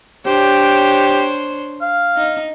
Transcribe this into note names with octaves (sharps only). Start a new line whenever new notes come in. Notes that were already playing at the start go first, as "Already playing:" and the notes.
D4 G4 C5 C#5
F5
D#4